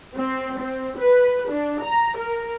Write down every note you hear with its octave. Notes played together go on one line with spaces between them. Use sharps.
C4
C4
B4
D4
A#5
A#4